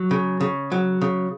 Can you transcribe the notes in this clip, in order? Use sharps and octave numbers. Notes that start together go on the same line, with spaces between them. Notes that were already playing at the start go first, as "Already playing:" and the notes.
Already playing: F#3
C#3
C#3
F#3
C#3